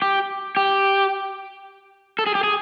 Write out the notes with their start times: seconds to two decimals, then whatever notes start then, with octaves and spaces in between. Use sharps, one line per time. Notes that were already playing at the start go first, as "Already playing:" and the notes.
0.02 G4
0.57 G4
2.19 A4
2.27 G#4
2.35 G4
2.43 G#4